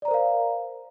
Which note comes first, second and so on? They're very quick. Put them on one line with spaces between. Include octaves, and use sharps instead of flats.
D5 A#5 C5 A#4 F5